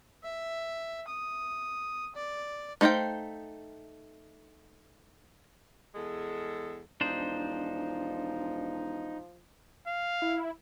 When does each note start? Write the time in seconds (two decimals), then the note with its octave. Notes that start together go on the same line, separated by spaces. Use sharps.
0.23 E5
1.08 D#6
2.16 D5
2.81 A3 D#4 C5 F5 G5
5.95 E2 G#3 G#4 A4
7.01 E1 F3 D4 D#4 C5
9.88 F5
10.22 E4